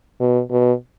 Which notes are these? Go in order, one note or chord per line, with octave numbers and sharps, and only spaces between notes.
B2
B2